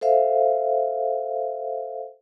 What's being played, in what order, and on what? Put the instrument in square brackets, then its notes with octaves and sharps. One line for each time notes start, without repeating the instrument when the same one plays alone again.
[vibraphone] A4 C5 E5 F5